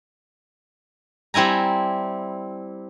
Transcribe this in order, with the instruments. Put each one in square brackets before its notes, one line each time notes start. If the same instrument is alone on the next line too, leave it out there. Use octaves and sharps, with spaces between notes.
[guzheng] G3 C4 E4 G#5 A#5